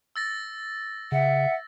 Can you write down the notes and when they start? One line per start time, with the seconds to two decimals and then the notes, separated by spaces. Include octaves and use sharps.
0.16 E6 A6 A#6
1.12 C#3 E5 F#5